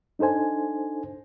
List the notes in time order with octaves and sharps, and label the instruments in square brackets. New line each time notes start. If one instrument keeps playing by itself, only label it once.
[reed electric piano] D4 D#4 A4 C5 G#5